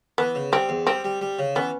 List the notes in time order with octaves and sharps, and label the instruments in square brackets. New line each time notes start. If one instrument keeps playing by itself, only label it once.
[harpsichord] E3 [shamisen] B3
[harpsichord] C#3
[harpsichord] G3 [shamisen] C4
[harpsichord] E2
[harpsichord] G3 [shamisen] C4
[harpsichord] G3
G3
C#3
[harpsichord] E3 [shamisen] B3 C#4